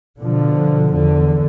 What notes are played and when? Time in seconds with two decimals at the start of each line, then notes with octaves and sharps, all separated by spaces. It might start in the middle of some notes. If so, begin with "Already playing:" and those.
0.19 B2 D3 F3
0.93 E2 D3